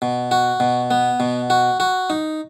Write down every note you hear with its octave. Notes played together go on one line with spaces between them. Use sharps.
B2
F#4
B2
B3
B2
F#4
F#4
D#4